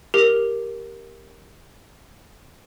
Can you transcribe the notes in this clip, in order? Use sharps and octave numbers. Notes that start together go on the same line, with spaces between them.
G4 A#4